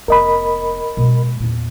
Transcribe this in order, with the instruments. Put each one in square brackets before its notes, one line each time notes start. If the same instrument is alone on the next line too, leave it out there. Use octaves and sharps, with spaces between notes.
[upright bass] F1 B3 [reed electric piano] A#4 D#5 B5
[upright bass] B2 G#3
E2 A#2